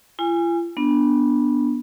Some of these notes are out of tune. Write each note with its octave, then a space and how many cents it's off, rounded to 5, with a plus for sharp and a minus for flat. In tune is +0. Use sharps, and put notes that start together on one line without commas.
F4 -45 G#5 -20
B3 -15 D4 +0